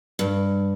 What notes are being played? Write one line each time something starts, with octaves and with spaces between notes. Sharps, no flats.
G2